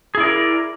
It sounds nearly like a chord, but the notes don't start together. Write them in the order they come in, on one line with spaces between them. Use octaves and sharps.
G#4 E4 D5 A#4